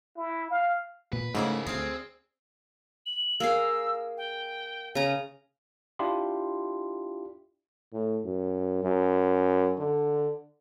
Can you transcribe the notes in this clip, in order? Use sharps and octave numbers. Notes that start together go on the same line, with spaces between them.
E4
F5
A#2 B4
G#2 C#3 A3 A#3 E4 G#4 D5 E5
D2 C4 G#4 F5
F#7
A#3 G#4 F5 E6
G5
C#3 A#5 D#7
D4 E4 F4 G4 C6
A2
F#2
F#2
D3